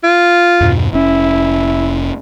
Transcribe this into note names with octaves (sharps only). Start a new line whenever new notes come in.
F4
E2 G2 B2
F1 C#4 E4